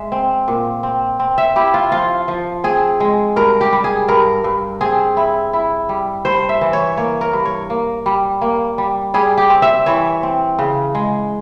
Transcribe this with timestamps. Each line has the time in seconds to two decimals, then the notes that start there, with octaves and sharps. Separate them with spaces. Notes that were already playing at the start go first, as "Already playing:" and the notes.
Already playing: G#3 E5
0.12 C4
0.48 A#2
0.83 C4
1.20 C4
1.38 E5
1.56 E4 G4
1.74 F4
1.91 F3 F4
2.28 F3
2.64 C4 G#4
3.00 G#3
3.36 G2 A#4
3.61 G4
3.73 G3
3.84 G#4
4.08 G2 A#4
4.44 G2
4.81 C4 G#4
5.17 E4
5.53 E4
5.89 G3
6.25 G2 C5
6.49 E5
6.61 E3
6.73 C#5
6.97 A#3 C#5
7.21 A#4
7.33 G2
7.45 C#5
7.70 A#3
8.06 G3
8.42 A#3
8.78 G3
9.14 G3 G#4
9.38 G4
9.50 C4
9.62 E5
9.86 E3 C#5
10.23 C4
10.59 C#3
10.95 G#3